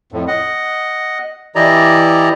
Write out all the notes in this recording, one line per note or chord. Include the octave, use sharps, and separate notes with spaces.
F2 A2
D#5 F#5
E3 E4 G4 D5 D#5 A#5